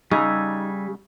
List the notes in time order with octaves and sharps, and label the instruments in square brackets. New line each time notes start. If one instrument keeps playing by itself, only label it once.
[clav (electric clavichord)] C#3 [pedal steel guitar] G3 G#5 E6 [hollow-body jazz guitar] D#4